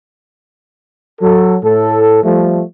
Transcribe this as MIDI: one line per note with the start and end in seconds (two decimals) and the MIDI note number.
1.21 1.56 54
1.21 1.56 69
1.62 2.20 45
1.62 2.20 69
2.23 2.61 53
2.23 2.61 55
2.23 2.61 57